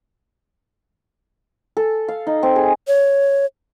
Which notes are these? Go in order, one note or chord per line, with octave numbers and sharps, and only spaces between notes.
A4
F5
D#4
C4
G#4
C#5